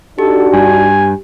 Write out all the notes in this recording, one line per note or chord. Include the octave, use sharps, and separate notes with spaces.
D4 D#4 F#4 G4 A4
G2 G#5